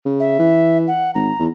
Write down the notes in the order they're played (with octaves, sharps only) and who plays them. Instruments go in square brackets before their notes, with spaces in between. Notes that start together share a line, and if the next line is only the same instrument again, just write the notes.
[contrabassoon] C#3
[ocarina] E5
[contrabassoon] E3
[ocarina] F#5
[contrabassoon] G#1 [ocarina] A#5
[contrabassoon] E2